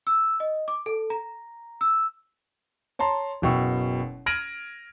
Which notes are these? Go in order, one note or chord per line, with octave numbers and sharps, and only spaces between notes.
E6
D#5
D6
A4
A#5
E6
C#5 A5 A#5 C6
F#1 B2 G5 C#6 E6
F6 G#6 A#6 D7 D#7 F#7